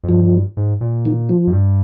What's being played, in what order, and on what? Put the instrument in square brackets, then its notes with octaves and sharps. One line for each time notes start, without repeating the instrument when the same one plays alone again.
[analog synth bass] F2
[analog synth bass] G2 [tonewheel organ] F3
[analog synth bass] G#2
A#2
[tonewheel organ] D#3
F3
[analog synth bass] F2
G2